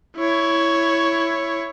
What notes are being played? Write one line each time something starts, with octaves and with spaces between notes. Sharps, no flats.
E4 C#5